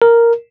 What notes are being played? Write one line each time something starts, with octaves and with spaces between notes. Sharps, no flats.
A#4